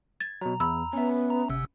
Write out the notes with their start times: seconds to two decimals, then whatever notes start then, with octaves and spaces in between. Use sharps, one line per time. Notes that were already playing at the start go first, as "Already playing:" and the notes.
0.20 G#6 A6
0.41 B2 F#3 A#5
0.60 E2 B5 E6
0.93 B3 C#4 E5
1.30 A#5
1.50 G1 C3 E6